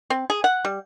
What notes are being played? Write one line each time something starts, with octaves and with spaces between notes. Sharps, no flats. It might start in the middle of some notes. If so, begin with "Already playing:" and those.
C4
G#4
F#5
G3